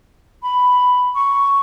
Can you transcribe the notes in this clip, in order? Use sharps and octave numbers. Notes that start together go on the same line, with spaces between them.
B5
C#6